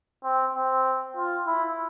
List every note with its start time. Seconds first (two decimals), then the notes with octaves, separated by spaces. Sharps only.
0.24 C4
0.55 C4
1.16 F4
1.47 E4